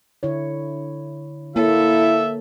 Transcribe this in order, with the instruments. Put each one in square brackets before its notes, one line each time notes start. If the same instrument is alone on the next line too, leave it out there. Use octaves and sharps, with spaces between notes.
[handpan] D3 E4 C#5
[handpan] A#3 C#5 [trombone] E4 [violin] A4 [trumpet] E5